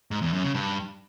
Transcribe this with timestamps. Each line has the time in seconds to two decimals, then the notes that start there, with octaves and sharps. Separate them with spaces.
0.11 G#2
0.22 E2
0.33 F#2
0.44 C#3
0.54 G2